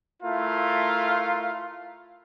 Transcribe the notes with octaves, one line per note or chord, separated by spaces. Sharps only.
A3 E4 F4 A#4 F5